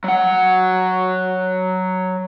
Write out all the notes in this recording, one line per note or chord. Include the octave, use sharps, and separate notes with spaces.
F#3 F#5